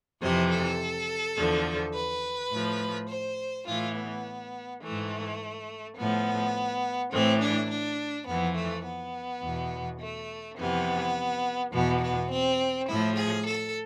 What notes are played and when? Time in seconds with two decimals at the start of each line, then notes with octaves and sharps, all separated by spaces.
0.21 F2 C3 E3 C5
0.50 A4
1.37 E2 D3 F3
1.95 B4
2.52 A2 F3
3.10 C5
3.67 A2 E3 F4
3.95 B3
4.82 G#2 E3 A3
5.97 A2 F3 B3
7.12 A2 E3 C4
7.41 D4
7.70 D4
8.27 F2 E3 B3
8.56 A3
8.85 B3
9.42 E2 B2
10.00 A3
10.57 F2 C3 E3 B3
11.73 E2 B2 B3
12.02 B3
12.30 C4
12.88 A2 F3 E4
13.17 G#4
13.46 A4